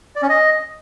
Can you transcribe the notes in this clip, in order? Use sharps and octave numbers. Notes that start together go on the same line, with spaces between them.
D5
C#4
D#5